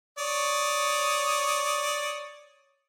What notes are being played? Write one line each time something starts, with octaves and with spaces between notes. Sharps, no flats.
C#5 D5 D#6